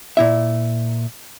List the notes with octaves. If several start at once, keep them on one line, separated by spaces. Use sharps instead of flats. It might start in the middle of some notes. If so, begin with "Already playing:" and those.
A#2 E4 E5